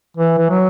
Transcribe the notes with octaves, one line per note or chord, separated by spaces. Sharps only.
E3
E3
F#3